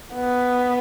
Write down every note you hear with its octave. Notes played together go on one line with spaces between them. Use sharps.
B3